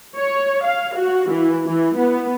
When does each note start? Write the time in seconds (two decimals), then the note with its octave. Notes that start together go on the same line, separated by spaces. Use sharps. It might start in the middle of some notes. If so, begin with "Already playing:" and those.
0.17 C#5
0.64 F5
0.96 F#4
1.30 E3
1.67 E3
1.97 B3